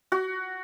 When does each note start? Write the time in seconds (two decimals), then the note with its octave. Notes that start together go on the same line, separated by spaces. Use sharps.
0.12 F#4